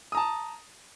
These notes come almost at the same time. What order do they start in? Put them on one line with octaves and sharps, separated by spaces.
D#6 A#5 A5